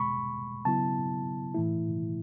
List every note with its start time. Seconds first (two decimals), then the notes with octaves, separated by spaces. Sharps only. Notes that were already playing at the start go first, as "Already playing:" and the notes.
Already playing: E2 B2 G#3 B5 C#6
0.65 C#3 F#3 B3 E4 A5
1.54 A2 E3 A3 E4